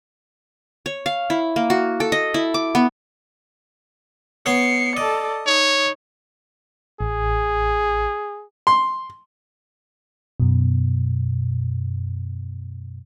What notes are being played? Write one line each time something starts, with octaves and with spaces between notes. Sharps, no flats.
C#5
F5
E4
A#3
F#4
A4
D#5
E4
D6
B3
B3 C#5 C7 C#7
A4 D5 D#5
D#4 C#5
A1 G#4
C6
F#2 B2